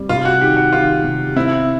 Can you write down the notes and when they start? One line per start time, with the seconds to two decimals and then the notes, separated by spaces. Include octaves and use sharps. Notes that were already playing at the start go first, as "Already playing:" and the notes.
Already playing: G3 C4
0.09 C3 F4
0.25 F#4
0.40 D#3 G4
0.56 F#4
0.73 D#3 F4
1.04 C3
1.36 C4 E4